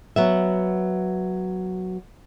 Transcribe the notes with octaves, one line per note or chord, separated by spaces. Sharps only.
F#3 B3 E5